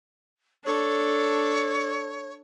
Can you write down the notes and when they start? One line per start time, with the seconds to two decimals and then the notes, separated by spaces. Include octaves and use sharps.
0.65 D4 A4 C#5